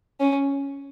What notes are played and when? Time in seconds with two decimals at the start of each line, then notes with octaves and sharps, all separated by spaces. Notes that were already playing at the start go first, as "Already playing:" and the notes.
0.20 C#4